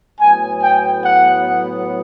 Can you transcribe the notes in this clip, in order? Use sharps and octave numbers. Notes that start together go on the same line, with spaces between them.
A2 F#3 B3 G#5
G5
F#5